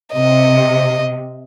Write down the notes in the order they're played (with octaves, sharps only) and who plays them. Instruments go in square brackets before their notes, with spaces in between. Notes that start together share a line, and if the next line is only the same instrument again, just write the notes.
[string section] C3 [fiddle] D#5